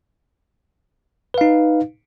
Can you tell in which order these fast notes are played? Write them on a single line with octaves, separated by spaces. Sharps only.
B4 F5 D#4